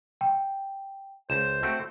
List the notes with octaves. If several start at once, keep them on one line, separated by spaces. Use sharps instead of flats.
G5
C#2 C5 E7
A3 C4 F#4